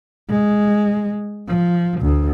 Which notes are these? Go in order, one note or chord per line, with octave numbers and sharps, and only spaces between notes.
G#3
F3
D2